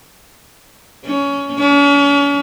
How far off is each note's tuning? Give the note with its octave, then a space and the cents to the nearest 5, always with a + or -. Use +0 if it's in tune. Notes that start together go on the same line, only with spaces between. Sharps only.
C#4 +20
C#4 +40